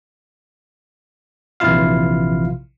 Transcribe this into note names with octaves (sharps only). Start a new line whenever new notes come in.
A#1 C3 E3 E4 F4 F5